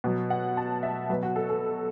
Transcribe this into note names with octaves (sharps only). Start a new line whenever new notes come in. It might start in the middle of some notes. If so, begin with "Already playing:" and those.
B2 F#3
F#5
A5
E5
B2 F#3 B4
F#4
A4
A4